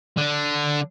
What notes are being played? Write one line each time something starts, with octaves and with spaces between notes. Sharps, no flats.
D3 D4